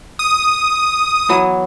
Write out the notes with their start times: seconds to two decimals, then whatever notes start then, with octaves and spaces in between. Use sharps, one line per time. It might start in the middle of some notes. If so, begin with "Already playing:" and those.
0.19 D#6
1.29 E3 F#3 B3